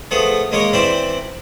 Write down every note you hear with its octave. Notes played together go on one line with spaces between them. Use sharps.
F3 A3 B3 G#4
G#3 A#3 C#4 A#4 C#5
E3 C4 E4 C5 D5